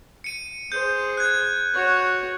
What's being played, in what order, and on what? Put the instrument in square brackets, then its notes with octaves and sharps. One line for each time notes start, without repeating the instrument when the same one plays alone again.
[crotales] C#7 D#7
[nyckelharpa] G#4 C5 [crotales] G6
[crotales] F#6 G#6
[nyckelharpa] F#4 C#5